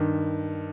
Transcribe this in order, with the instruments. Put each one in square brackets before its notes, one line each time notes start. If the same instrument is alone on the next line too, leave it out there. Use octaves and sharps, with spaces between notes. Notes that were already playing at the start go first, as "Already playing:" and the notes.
Already playing: [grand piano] G2 D#3